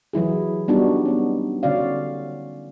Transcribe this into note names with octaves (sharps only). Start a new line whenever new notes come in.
E3 F#3 E4 G#4
G3 B3 D4 D#4 F#4
B3 C#4
D3 C#4 F#4 D5 F5